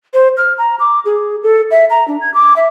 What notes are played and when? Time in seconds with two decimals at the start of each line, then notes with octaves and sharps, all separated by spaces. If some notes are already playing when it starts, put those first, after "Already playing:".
0.14 C5
0.37 F6
0.58 A#5
0.79 D6
1.05 G#4
1.43 A4
1.71 E5
1.90 A#5
2.08 D4
2.21 G#6
2.34 D6
2.56 E5